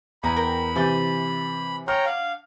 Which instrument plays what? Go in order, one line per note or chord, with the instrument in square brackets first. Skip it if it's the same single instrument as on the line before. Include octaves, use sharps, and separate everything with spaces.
[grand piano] E2 [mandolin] F#5 G#5 A#5 [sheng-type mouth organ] B5
[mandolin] A#4 G5
[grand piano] C3 E3 A6 [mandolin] G#5 C6 G6
[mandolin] G#4 C6 [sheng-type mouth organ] C#5 G5 A#5 [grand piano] F6
[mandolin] D4 C#5 F#5 [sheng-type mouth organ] F5